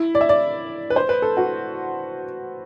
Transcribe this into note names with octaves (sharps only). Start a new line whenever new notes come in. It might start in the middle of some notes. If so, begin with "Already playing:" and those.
Already playing: E4
D5
E5
D5
B4
C5
B4
A4
F#4